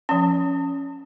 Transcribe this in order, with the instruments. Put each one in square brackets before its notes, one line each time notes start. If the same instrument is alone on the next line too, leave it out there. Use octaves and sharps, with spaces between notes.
[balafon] F3 C#4